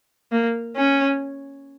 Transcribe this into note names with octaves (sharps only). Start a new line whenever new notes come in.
A#3
C#4